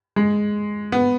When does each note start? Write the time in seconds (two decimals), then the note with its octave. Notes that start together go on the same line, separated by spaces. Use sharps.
0.16 G#3
0.92 B3